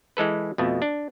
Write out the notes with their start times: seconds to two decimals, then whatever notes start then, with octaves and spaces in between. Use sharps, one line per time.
0.17 E3 G#3 A4 B4
0.58 F2 B2 A3
0.82 D4